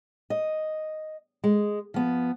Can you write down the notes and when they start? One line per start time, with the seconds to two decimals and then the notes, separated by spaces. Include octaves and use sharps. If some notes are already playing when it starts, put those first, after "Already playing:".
0.30 D#5
1.44 G#3
1.94 F3 B3